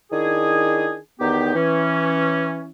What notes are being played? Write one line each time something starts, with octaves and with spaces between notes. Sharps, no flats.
D#3 D4 E4 G#4
E2 D#3 B3 D#4 G4
E3 C#4